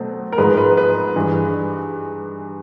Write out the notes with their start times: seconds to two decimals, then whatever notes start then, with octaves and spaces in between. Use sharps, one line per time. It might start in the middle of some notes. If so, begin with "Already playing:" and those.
Already playing: B2 F#3 A3 C4
0.32 A#4
0.37 G#2 F3 G#3 B4
0.57 B4
0.77 B4
1.16 G2 E3 G#3